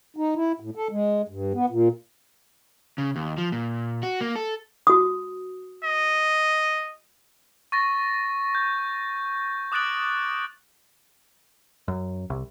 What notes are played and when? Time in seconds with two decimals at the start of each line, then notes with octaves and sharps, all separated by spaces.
0.16 D#4
0.35 E4
0.60 A2
0.75 A4
0.91 G#3
1.29 G2
1.54 B3
1.70 A#2
2.98 C#3
3.16 D#2
3.38 F3
3.52 A#2
4.03 F#4
4.21 A#3
4.36 A4
4.87 F#4 D#6
5.84 D#5
7.72 C#6 A6 A#6
8.55 G6
9.72 D6 D#6 F#6 A6 D7 F#7
11.88 F#2
12.30 C2